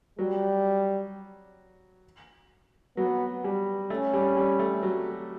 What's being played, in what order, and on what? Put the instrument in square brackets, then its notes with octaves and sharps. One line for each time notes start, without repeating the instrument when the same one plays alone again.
[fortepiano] F#3 [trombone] G3
[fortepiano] F#3 [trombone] B3
[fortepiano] G3
[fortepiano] A3 [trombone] C#4
[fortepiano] G3
G3
A3
F#3